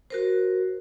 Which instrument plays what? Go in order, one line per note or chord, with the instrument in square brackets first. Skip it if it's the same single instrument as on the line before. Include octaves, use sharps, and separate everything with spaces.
[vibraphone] F#4 A#4 C5